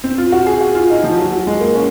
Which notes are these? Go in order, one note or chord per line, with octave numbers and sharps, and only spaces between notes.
C4
F4
F#4
G#4
F#4
F4
D#4
F3
F#3
F#3
G#3
A#3
C#4